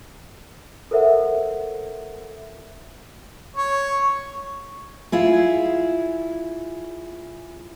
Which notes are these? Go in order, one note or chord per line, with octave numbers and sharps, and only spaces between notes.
A4 A#4 C5 E5 F#5
C#5
E4 F4 G#4